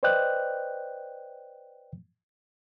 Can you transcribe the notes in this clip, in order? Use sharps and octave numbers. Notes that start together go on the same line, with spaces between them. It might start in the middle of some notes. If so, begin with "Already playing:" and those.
B4 C5 D5 D#5 G5 F#6